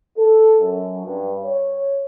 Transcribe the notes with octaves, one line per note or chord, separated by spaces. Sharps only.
A4
F#2
G2
C#5